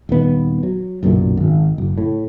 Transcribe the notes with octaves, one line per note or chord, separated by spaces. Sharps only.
D#1 D#2 B3
F#3
F#1 B1 F#2 A#2
G#1
F#1
A2